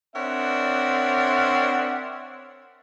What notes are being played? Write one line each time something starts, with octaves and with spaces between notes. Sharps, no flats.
C4 D4 A#4 C#5 E5 F#5